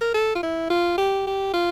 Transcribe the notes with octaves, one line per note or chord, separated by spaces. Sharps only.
A#4
A4
F4
E4
F4
G4
G4
F4